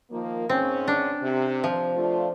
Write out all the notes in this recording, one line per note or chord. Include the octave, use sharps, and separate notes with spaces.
D#3 F3 A#3
G#2 C4 C#4
D4
C3
F3
A3 D4 F4